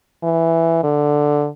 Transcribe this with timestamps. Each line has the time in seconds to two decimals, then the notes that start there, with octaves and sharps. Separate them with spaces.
0.24 E3
0.83 D3